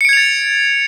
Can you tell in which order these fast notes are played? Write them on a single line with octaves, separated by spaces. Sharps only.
C#7 D7 G#6 F7 A6